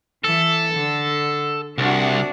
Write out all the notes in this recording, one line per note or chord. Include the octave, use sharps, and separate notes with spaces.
E3 A4
D3
C2 D4 F#4